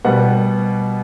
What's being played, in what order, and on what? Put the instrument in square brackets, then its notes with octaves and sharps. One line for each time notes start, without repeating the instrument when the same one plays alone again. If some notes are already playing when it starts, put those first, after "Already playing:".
[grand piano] B2 G3 B3 F#5